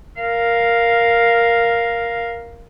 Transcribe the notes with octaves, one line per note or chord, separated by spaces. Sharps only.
A#4 F5